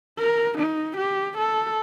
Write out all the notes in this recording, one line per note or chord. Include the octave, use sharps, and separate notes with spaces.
A#4
D#4
G4
A4